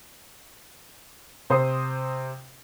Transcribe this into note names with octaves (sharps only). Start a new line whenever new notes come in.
C3 C5 C6 D#6 C7